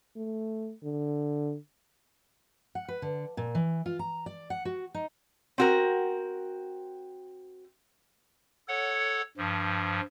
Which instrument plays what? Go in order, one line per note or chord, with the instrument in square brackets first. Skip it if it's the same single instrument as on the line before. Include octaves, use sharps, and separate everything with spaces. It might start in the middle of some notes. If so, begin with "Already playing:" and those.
[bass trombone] A3
D3
[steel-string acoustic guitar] F#5
B4
D3
A#2
E3
F4
A#5
D5
F#5
F#4
D#4
[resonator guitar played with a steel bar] C4 F#4 A#4
[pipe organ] A4 C#5 F#5
G2 F3